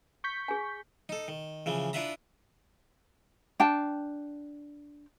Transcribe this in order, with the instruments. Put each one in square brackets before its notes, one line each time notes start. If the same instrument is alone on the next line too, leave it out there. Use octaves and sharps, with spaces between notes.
[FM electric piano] C#6 G6 B6
[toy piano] G#4 G#5
[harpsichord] D#4 A4
D#3
C#3 E3 F3
D4 E4 F4 B4 E5 A#5
[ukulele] D4 G5 A5